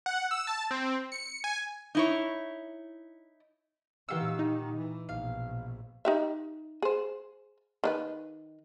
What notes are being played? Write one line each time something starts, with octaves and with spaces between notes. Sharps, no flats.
F#5
E6
A5
C4
C#7
G#5
D#4 E4 C#5
A#2 D#3 E3 G4 F5 F#5 E6
D#4
E3
A#1 B2 F5
D#4 G4 E5
G#4 C5
D#3 D4 B4